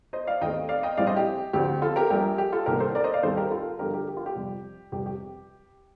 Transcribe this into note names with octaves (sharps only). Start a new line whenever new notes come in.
C5 D#5
D5 F5
D#2 D#3 A3 C4 D#5 G5
D5 F5
D#5 G5
A#1 A2 G3 C4 D5 F5
C5 D#5
G4
D2 D3 F3 C4 G4
F4 A4
G4 A#4
A#1 A#2 G3 G4 A#4
G4
F4 A4
C2 C3 D#3 A#3 G4 A#4
A4 C5
A#4 D5
C5 D#5
D5 F5
D#2 D#3 G3 C4 A4 C5
G4 A#4
F4 A4
G2 D3 F3 G4 A#4
G4 A#4
G4
F4
G4
F2 C3 G3
F1 F2 C3 G3 G4
G4